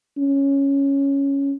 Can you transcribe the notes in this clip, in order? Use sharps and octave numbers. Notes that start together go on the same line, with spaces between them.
C#4